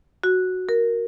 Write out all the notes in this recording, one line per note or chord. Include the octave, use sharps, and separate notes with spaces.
F#4
A#4